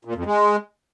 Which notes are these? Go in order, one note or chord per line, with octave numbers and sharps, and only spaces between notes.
A#2
F2
G#3